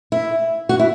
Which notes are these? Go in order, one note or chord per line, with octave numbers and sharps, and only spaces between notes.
E4
F#4
E4